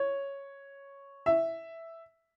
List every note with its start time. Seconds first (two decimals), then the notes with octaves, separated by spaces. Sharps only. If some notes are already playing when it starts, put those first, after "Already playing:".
Already playing: C#5
1.26 E5